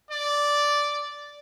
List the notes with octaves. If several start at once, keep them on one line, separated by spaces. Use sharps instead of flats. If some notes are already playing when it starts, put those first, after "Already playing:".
D5